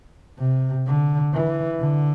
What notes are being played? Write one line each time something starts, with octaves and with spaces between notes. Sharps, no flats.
C3
D3
E3
D3